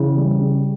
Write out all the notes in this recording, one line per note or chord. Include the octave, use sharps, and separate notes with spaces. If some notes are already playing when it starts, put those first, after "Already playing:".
Already playing: C#3 E3
G3
C#3